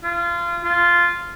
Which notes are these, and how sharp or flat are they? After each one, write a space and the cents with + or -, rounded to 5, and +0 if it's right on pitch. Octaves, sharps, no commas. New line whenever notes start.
F4 -25
F4 -10